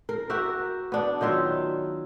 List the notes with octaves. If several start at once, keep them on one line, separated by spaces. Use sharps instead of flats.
A#4
F#4 G4 A#4 E5
B3 D4
D#3 F#3 F4 E5